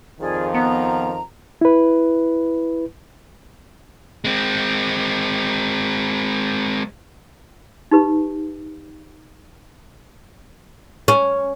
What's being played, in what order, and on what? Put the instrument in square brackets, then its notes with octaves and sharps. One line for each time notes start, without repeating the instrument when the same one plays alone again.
[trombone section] F2 D#3 F3 [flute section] G#4 D5
[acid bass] B3 [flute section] A#5
[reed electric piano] E4 B4
[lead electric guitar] G#3 C4
[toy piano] D#4 G4 B4
[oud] C#4